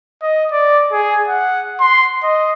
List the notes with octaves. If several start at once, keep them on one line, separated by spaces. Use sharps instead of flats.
D#5
D5
G#4
F#5
C6
D#5